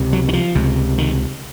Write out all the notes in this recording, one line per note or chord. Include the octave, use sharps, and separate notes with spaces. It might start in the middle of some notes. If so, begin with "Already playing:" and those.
Already playing: C#2 C3
F#3
D#3
F3
C#2 C3
D#3